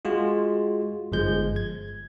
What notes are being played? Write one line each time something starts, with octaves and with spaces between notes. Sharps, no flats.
G#3 F4 F#4
G1 F3 G#3 G6
G#6